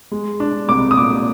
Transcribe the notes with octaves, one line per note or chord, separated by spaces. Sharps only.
G#3
D4
C2 D6
D#6
A#2 D6